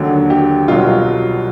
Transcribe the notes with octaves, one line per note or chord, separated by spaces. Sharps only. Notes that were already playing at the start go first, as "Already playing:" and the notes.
Already playing: D#2 D3 F#3
G4
C2 B2 F#3 F4